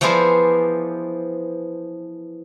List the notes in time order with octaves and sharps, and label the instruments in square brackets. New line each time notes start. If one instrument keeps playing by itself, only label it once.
[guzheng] E3 F3 B3 G#4 C5 D5